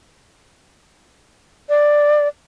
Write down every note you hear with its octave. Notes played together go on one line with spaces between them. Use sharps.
D5